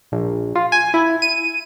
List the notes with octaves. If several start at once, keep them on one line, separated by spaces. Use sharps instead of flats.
A#1
F4
G#5
E4
D#7